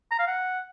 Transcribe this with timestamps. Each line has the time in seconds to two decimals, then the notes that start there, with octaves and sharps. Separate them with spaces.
0.11 A#5
0.19 F5
0.27 F#5